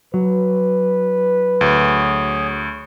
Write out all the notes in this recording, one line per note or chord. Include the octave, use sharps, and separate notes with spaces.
F#3 B4
D2 G#4 C#5